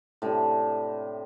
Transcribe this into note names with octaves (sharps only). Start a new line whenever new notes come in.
A2 C3 D4